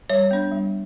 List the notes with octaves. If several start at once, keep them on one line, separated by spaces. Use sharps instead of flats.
G3 C#5
B3 D4
G3